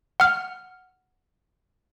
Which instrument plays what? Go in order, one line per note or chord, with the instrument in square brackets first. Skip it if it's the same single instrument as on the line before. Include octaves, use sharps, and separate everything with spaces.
[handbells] F#5 F6